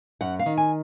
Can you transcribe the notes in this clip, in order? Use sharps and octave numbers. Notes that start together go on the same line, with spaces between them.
F#2 F#5
F5
D#3
G#5